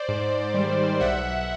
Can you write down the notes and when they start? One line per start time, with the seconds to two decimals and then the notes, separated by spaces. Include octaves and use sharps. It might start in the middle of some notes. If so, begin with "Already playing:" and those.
Already playing: C5 D5
0.08 G#2
0.54 D#3 G3
1.00 B1 E5 F#5